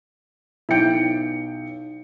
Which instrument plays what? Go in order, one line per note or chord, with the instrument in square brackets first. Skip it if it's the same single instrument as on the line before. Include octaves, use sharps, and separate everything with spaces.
[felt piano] B1 C#7 [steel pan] E4 G5